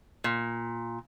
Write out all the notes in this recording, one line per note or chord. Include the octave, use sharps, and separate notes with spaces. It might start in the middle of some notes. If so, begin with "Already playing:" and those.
A#2